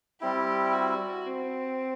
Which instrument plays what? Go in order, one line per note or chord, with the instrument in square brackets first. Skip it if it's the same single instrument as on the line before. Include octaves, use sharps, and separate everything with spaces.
[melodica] G3 C4 E4 [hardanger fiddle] G4
[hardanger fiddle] F#4
C4